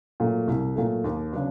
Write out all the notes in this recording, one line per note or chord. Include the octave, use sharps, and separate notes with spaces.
A#2 F#3 A3
C2
A#2 F#3 A3
D#2
C#3 F#3 B3 D4